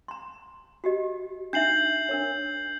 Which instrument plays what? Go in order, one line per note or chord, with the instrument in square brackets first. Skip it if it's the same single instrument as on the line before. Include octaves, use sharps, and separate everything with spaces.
[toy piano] A#5 C6
F#4 G4 D#5
[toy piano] D4 D#4 E5 [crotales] G6 C7 F#7
[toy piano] D4 A#4 C#5